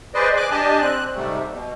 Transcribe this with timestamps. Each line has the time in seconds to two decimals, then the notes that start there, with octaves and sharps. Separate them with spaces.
0.15 G#4 B4 C5 D5 D#5
0.37 G#5 D6 F#6
0.51 D4 G4 D#5 G#5 A5
0.81 C4 F#6
1.15 G#2 C3 G3 A3
1.52 B2